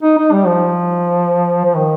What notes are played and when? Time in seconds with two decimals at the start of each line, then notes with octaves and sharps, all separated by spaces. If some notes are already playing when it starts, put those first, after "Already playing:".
0.03 D#4
0.18 D#4
0.32 G3
0.47 F3
1.65 F3
1.76 D#3